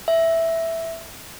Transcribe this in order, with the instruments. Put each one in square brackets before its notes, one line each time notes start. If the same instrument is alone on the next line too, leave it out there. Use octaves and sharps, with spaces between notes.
[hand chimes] E5